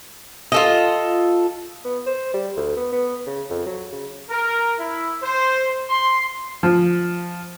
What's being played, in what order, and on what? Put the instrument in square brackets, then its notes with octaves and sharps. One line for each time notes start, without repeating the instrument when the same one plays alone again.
[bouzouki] F4 A4 D#5
[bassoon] B3
C5
G3
D2
B3
B3
C#3
F2
F#3
C#3
[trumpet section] A#4
E4
C5
C6
[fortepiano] F3